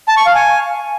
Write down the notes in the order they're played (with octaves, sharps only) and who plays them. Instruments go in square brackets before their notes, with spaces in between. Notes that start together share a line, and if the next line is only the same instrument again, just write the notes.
[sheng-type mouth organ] A5
C#6
F5
G#5